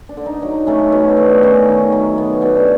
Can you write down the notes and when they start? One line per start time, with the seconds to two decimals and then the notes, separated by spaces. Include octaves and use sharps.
0.09 D4
0.17 D3
0.26 D#4
0.42 F#3 D#4
0.67 A3 C#4
0.92 B2
1.09 D4
1.17 A3
1.43 D#3 C#4
1.68 D#3
1.92 F#3
2.18 B3
2.42 B2 D4